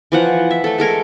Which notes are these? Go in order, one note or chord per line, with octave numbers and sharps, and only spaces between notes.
E3 F3 F#5
E5
A3 A4
G#3 A4 A#4 C#5